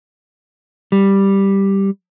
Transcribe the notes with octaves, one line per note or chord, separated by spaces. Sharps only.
G3